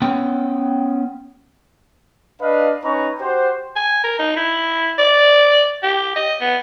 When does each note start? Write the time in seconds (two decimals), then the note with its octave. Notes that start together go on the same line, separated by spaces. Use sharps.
0.02 B3 C#4 G5
2.41 D4 B4 D#5 F5
2.83 C#4 D#4 B4 A#5 C#6
3.20 F#4 G4 C5
3.76 G#5
4.04 A#4
4.19 D#4
4.36 E4
4.99 D5
5.83 G4
6.16 D#5
6.41 B3